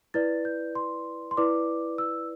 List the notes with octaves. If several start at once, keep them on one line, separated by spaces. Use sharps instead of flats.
E4 B4 D5 A6
G6
C6
C6
E4 B4 D5 D6
E6